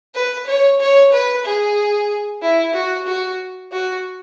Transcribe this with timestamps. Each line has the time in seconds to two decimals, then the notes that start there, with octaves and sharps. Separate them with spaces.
0.14 B4
0.46 C#5
0.79 C#5
1.12 B4
1.45 G#4
2.42 E4
2.74 F#4
3.07 F#4
3.72 F#4